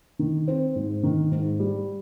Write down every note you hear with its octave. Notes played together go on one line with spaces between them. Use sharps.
D#3
C4
G#2
D#3
G#2
G3